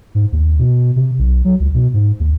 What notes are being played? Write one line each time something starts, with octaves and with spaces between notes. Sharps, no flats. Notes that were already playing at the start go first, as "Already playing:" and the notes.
G#2
D#2
B2
C3
B1
F#3
C#2
B2
G#2
D#2